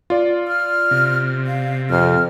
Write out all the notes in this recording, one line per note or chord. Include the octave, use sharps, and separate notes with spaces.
F4 D5
F6
C3
F5
F2 F6